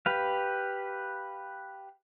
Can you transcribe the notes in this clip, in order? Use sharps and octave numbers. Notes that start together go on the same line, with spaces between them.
G4 B4 F5